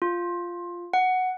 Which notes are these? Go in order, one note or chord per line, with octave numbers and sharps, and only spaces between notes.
F4
F#5